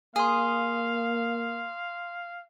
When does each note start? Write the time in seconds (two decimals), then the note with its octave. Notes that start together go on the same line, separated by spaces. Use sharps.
0.16 A#3 G#4 F5 C6 D#6